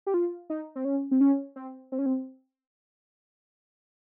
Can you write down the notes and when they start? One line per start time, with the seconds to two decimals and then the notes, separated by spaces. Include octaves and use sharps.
0.07 G4
0.14 F4
0.50 D#4
0.76 C4
0.85 C#4
1.11 C4
1.21 C#4
1.56 C4
1.92 C4
1.99 C#4
2.06 C4